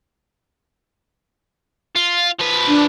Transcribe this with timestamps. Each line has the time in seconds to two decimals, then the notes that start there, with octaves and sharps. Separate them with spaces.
1.96 F4
2.40 F3 B4
2.68 D4